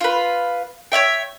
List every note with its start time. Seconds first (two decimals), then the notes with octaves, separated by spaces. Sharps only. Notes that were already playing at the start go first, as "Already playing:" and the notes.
0.01 F4 B4
0.92 C#5 D5 E5 G5